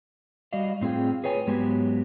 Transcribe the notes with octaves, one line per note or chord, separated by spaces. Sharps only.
G3 F#4 D5 D#5 F5
A2 C4 F4 G#4 G5
G#4 B4 C#5 G5 G#5
G#2 F#3 G#3 B3 G4 G#5